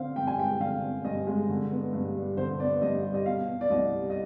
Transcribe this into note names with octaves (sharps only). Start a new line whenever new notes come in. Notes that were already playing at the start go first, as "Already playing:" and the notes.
Already playing: D3 C4 F5
G2 G5
G#5
G#3 G5
D3 F5
C4
G2 D#5
G#3
D3
B3
G2
G3
D3 C5
B3 D5
G2 D#5
G3
D#5
B2 F5
B3
D5
C2 D#5
G3
D#5